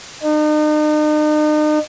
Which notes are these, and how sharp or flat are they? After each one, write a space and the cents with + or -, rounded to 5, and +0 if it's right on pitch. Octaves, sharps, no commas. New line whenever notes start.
D#4 -40